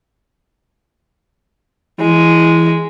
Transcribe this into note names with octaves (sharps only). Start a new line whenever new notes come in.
E3 G#3